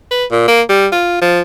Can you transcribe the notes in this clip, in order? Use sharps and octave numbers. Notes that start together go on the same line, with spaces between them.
B4
A#2
A#3
G3
F4
F3